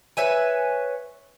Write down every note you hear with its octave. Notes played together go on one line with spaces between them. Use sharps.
B4 C#5 E5 G#5